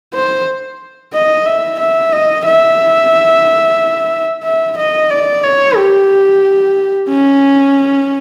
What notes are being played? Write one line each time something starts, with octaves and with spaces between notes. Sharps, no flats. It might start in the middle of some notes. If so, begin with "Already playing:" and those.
C5
D#5
E5
E5
D#5
E5
E5
D#5
D5
C#5
G4
C#4